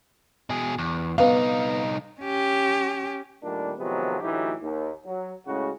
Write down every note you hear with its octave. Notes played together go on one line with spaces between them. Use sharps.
B2 G#4
E2
C2 B3 D#4 B4 F5
C#4 G4
A#2 D#3 G3 A3 A#3 D4
C3 D#3 F3 F#3 G#3 B3
D2 A2 E3 F#3 D#4 G4
D#2
F#3
A2 C#3 G#3 C#4 F#4